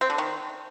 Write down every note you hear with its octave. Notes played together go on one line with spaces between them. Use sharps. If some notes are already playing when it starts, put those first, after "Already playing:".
C4
D3
D#3